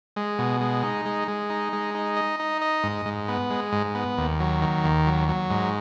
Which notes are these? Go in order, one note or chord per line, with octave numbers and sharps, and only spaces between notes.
G#3
B2
G#3
D#4
G#3
G#3
D#4
G#3
D#4
D#5
D#4
D#5
G#2
G#2
B3
G#3
G#2
B3
D#2
F#3
D#3
D#2
F#3
F#3
G#2